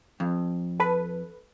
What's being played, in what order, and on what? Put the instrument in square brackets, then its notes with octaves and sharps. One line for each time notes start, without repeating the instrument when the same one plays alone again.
[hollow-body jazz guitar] F2
[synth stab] A4 B4